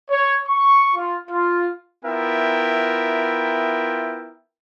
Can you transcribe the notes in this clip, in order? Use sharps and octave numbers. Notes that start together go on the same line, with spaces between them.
C#5
C#6
F4
F4
B3 E4 F4 A#4 E5 G5